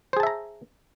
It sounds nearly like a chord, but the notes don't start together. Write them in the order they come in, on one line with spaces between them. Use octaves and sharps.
C5 G#4 A5 E5 A#5